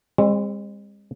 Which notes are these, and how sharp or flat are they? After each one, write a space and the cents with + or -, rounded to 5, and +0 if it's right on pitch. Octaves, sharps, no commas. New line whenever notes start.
G#3 -40 C4 +25